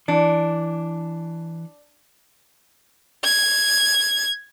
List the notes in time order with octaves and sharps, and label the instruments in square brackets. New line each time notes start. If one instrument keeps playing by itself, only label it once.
[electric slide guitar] E3 [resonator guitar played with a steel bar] D4
[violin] G#6